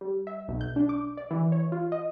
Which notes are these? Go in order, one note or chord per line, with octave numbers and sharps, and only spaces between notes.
G3
E5
B1
G6
D4
D6
D5
E3
C#5
F4
D#5